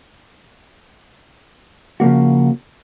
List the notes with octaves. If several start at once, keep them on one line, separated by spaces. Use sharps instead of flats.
C#3 F3 A#3 F#4